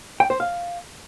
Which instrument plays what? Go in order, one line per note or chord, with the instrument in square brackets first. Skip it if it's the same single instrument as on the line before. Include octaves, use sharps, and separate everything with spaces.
[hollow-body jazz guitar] G5
C5
F5